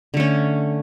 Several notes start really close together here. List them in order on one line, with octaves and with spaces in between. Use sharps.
D3 A3 C#4